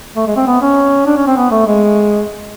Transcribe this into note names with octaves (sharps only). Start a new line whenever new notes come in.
A3
G#3
C4
B3
C#4
D4
C#4
C4
B3
A3
G#3